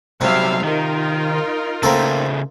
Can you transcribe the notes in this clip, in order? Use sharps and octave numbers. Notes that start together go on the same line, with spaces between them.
C2 C3 F#3 G3 E5 F5
D#3 D#4 F4 A#4
C#3 A3 A#3 C4 A4